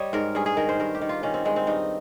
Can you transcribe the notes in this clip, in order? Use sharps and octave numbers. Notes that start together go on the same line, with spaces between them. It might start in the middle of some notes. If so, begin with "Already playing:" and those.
Already playing: G3 C#5 D#5
G#2 A#4
G2 G#4
G#4
D#3 A#4
C5
G2 A#4
G4
D#3
F4
D#3 C#4
C4
G2 G#3
C4
G2 D#4